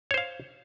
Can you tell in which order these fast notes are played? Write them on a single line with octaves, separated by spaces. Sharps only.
C#5 C5 F5